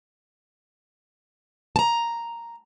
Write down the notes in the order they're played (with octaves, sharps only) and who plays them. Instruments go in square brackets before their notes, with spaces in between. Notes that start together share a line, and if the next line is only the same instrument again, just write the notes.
[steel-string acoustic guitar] A5 A#5